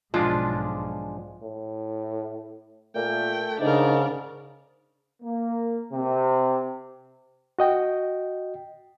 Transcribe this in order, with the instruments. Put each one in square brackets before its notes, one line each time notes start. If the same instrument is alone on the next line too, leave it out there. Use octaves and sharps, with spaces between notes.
[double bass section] B1 G#2 [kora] F3 [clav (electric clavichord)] G#3 D4 F4
[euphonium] A2
[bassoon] A#2 [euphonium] A3 [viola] G5
[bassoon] G#2 [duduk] C#3 [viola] D4 A#4 [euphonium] D#4
[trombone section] A#3
C3
[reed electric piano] F#4 D#5 G5